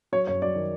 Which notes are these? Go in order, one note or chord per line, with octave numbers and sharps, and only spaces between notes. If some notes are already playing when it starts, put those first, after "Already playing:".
F#3 C#5
F#2 C#5
F#3 D5
D#3